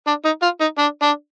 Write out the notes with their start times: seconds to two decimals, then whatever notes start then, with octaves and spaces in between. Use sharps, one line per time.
0.07 D4
0.25 D#4
0.42 F4
0.60 D#4
0.78 D4
1.02 D4